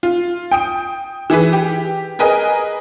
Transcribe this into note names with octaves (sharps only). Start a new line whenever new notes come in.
F4
G5 D#6 D7
E3 E4 G#4 B4
G4
G#4 A#4 B4 D#5 G#5